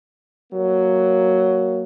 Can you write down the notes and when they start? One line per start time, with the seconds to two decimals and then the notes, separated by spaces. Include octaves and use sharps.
0.52 F#3 A#3